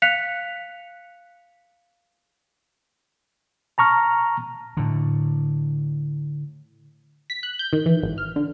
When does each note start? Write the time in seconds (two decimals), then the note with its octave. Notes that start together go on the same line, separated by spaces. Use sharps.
0.02 F5 F#6 B6 C#7 F7
3.78 A5 A#5 C#6 F6
4.77 A2 D3
7.30 B6
7.43 F#6
7.59 G6
7.73 D#3
7.86 E3
8.03 G#1
8.18 F6
8.36 D3